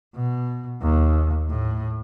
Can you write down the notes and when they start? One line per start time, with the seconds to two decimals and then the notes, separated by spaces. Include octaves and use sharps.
0.15 B2
0.82 D#2
1.49 A2